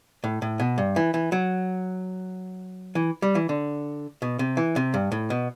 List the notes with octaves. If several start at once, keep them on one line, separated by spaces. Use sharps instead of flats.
A2
A2
B2
G2
E3
E3
F#3
E3
G3
E3
D3
B2
C3
E3
C3
G2
A2
B2